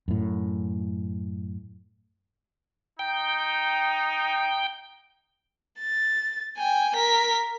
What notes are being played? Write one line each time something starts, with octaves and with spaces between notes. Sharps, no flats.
F#2 A2
D#4 G5
A6
G5 G#5
A#4 B6